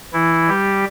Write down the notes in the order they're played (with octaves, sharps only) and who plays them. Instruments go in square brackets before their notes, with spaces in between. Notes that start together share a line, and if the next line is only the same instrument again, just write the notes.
[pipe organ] E3 E4
G3 G4